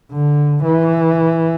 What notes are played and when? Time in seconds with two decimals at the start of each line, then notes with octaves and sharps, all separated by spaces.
0.12 D3
0.64 E3